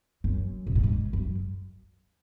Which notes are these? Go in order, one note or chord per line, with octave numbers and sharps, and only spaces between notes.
F#2
C3
A#2
G#2
F#2